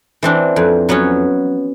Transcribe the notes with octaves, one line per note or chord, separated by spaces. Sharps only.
E3 C4 D4
F2
F#3 B3 C#4